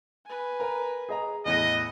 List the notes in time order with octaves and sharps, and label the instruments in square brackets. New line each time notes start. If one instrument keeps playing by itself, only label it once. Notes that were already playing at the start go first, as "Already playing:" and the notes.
[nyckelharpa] B4 G#5
[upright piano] A#4 A#5
G#4 D#5 A#5
[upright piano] E2 A2 A#6 [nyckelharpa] E4 F#5 [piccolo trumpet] D#5